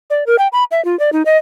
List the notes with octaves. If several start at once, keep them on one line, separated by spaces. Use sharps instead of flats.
D5
A#4
G5
B5
E5
F4
D5
D#4
D#5